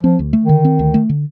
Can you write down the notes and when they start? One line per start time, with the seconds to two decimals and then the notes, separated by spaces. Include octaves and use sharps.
0.03 F3 C4
0.19 D2
0.33 A3
0.44 D#3
0.49 D3
0.64 C4
0.79 D2
0.94 A3
1.09 D3